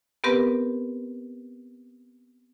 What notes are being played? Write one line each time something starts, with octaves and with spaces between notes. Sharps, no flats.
B3 C4 G4 A#4 B4